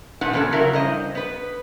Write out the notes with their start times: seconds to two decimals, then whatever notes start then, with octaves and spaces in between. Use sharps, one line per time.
0.21 A#2 D4 D#4 B4 F#5
0.33 E3 F3 B3 C#4 A4
0.52 C#3 F#3 E4 A#4
0.73 G2 C5 D#5
1.15 B3 B4